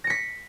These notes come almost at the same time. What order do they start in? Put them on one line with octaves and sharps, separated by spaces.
A#6 C#7 B6